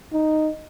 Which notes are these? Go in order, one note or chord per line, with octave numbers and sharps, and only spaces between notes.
D#4